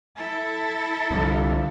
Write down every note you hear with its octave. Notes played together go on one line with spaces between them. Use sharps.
E4 A4
C2 D3 F3